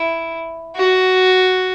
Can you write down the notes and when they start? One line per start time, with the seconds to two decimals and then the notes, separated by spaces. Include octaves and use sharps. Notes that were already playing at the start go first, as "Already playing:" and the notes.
Already playing: E4
0.76 F#4